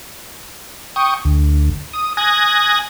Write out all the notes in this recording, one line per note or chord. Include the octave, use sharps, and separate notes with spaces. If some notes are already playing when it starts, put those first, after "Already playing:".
G5 C#6 D#6
D2
D#6
G#5 D#6 F#6 G#6 A#6